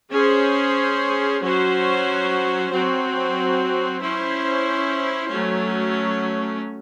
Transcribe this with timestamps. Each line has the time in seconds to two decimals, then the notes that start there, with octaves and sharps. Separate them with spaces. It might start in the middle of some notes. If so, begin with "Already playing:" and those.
0.10 C#4 G#4 C5
1.41 F#3 C#4 F#4 C5
2.71 F#3 C4 F#4
4.01 C#4 E4 C5
5.31 F#3 A3 C#4